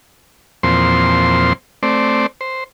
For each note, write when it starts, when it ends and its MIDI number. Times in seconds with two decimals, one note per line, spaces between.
0.63 1.53 40
0.63 1.53 46
0.63 1.53 53
0.63 1.53 60
0.63 1.53 72
0.63 1.53 84
1.83 2.26 57
1.83 2.26 60
1.83 2.26 72
1.83 2.26 74
2.41 2.64 72